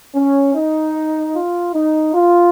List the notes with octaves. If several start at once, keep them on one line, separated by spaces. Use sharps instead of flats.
C#4
D#4
F4
D#4
F4